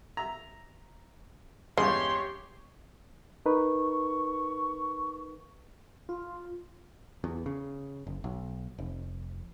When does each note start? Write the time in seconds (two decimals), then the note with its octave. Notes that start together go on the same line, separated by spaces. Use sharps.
0.17 E5 A#5
1.77 E2 G2 C#3 G#3 G4 C#5 C6
3.46 D#4 A#4 B4 C#6
6.09 F4
7.24 E2
7.46 C#3
8.07 F#1
8.24 B1
8.79 F1